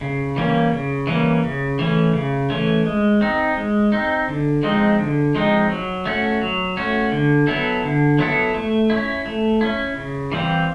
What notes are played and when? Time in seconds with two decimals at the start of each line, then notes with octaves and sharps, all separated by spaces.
0.01 C#3
0.36 E3 G3 A#3 C#4
0.71 C#3
1.07 E3 G3 A#3 C#4
1.43 C#3
1.79 E3 A3 C#4
2.13 C#3
2.50 E3 A3 C#4
2.85 G#3
3.21 C4 D#4
3.56 G#3
3.92 C4 D#4
4.28 D3
4.63 F3 G#3 C4 D#4
4.99 D3
5.35 F3 G#3 C4 D#4
5.70 F#3
6.05 A3 C#4 F#4
6.41 F#3
6.77 A3 C#4 F#4
7.12 D3
7.47 F#3 B3 E4 A4
7.84 D3
8.19 F#3 B3 E4 A4
8.54 A3
8.90 C#4 E4
9.26 A3
9.61 C#4 E4
9.96 C#3
10.32 E3 G3 C4 F4